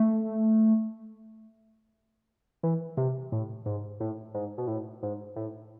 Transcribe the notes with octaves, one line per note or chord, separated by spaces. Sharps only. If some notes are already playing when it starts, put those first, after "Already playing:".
Already playing: A3
E3
C3
A2
G#2
A2
G#2
B2
A2
G#2
A2